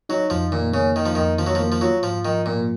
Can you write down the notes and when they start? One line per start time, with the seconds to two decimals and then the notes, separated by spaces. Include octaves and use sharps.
0.09 F#3 D#4
0.30 F2 F3
0.52 A#2 D#3
0.73 C#3 A#3
0.95 D#3 D#4
1.06 F3
1.15 F2 D#3
1.39 D#3 F3
1.47 F#3
1.55 F3 A#3
1.72 F3
1.81 F#3 F4
2.03 G#2 F3
2.25 D#3 F3
2.46 A#2 A#3